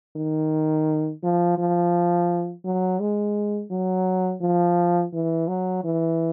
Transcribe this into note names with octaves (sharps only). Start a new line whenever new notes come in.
D#3
F3
F3
F#3
G#3
F#3
F3
E3
F#3
E3